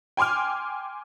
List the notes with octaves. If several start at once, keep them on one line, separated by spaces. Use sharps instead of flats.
G5 G#5 C6 D6 F6